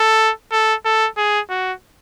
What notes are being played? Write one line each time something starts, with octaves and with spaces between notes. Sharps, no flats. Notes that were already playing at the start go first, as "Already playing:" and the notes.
Already playing: A4
A4
A4
G#4
F#4